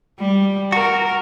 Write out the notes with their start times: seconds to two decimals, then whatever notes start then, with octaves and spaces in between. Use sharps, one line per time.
0.19 G3
0.72 F#4 A#4